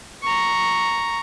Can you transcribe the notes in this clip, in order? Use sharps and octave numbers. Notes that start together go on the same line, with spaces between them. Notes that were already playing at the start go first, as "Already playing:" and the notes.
A#5 C#6